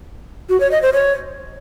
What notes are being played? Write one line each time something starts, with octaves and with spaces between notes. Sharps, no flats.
F#4
C#5
D#5
C5
C#5